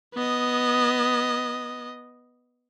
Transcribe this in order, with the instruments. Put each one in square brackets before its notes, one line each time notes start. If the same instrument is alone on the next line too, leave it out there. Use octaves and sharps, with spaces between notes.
[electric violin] B3 D#5